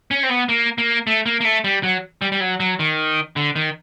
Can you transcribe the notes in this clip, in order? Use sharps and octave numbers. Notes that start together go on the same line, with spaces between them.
C#4
C4
B3
A#3
A#3
A3
A#3
A#3
A3
G3
F#3
G3
G3
F#3
F#3
D#3
D3
D#3